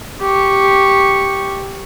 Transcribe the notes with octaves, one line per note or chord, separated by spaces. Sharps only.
G4 C#6